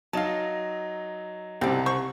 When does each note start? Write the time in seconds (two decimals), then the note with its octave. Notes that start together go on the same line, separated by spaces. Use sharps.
0.13 F#3 D#4 F5 A5
1.61 C2 C3 C4 D5
1.86 C5 C#6